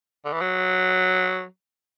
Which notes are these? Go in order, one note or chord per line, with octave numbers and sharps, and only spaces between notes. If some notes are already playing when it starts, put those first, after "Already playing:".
D3
E3
F#3